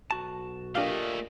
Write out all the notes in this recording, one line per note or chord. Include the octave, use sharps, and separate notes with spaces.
B1 F#4 A5
A#2 A3 D4 G4 D#5 F5